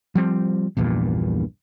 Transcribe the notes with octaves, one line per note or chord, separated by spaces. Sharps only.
F3 G3 C4
A#1 E2 G2 A#2